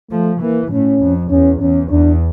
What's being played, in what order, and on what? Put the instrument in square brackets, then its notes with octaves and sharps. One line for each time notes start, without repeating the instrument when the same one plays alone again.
[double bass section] F3 [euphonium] A3
[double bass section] E3 [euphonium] A#3
[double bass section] A2 [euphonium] C#4
[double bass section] F2
[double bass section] E2 [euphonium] C#4
[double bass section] E2 [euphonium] C#4
[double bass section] E2 [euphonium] D4